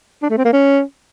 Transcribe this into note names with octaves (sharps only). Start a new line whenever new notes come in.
D4
A3
C4
A#3
C#4